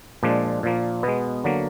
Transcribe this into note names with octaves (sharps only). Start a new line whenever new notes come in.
A#2 F3 G#3 D4
A#2 F3 A#3
B2 G#3 B3
D3 F#3 A#3